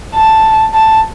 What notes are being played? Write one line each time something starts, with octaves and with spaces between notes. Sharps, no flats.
A5
A5